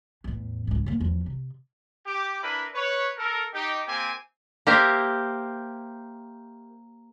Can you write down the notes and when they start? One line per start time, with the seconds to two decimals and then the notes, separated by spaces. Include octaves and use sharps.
0.24 E2 A2
0.67 C#2 G#2
0.86 D3 A#3
1.00 E2 F3
1.26 C3
2.06 G4 D6
2.42 D4 E4 A#4 B4 B5
2.74 B4 C#5
3.17 A4 A#4
3.53 D#4 G4
3.87 A#3 C4 G4 G#5
4.67 A#3 G4 A#4 C5 E5